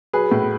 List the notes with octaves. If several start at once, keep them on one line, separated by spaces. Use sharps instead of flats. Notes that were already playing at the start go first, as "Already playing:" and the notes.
F#3 G#4 B4
A2